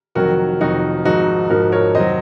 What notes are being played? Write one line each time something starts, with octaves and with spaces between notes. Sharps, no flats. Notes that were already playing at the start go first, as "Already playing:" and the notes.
F1 F2 D#3 F#3 F#4 A#4
F1 F2 D#3 F#3 D#4 F#4
G#1 G#2 F3 D#4 F#4
G#1 G#2 F3 F#4 A#4
A#4 C#5
F1 D#3 F#3 C5 D#5